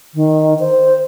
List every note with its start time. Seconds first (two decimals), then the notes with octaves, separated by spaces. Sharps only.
0.15 D#3
0.59 C5